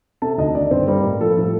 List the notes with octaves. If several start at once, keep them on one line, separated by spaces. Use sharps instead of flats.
C3 A4 A5
D2 D#4 D#5
D#3 D4 D5
G2 C4 C5
G3 A#3 A#4
A2
F3 A4
A2 A4